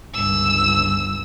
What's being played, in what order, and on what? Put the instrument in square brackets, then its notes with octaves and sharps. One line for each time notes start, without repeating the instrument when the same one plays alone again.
[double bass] G1 C#2 [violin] E6